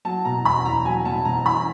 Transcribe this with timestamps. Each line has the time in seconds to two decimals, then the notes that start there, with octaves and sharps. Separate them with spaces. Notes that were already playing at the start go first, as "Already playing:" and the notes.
0.05 F#3 A5
0.25 B2 A#5
0.44 E1 B5
0.65 E2 A#5
0.85 F#3 G#5
1.05 B2 A5
1.25 E1 A#5
1.45 E2 B5